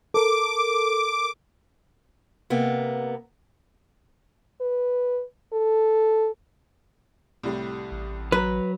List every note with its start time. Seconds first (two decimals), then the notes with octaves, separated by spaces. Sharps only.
0.14 A4 A#4 D6
2.50 C3 A#3 B3
4.61 B4
5.53 A4
7.43 C2 A2 G3
7.92 A1
8.32 F#3 B4 A#5